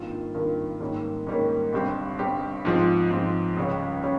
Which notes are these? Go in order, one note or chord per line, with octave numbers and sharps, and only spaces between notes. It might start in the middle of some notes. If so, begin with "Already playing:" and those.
Already playing: G#1 G2 D#3 A#3 F4
G#1 G2 D#3 A#3 F4
G#2 D#3 G3 A#3 C#4
G#2 D#3 G3 A#3 C#4
G1 G2 G3 C4 G4
G1 G2 G3 C4 G4
G#2 F3 C4
G#2 F3 C4
C#2 C#3 G3 C#4
G3 C#4